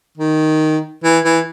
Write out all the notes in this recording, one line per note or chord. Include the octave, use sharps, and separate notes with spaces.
D#3
E3
E3